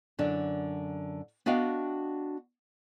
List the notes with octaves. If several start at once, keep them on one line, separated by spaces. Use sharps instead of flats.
F#2 D3 D4
B3 D4 F#4 D#5 F5 G5